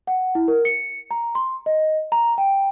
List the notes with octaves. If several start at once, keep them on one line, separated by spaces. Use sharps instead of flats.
F#5
E4
A#4
C#7
A#5
C6
D#5
A#5
G5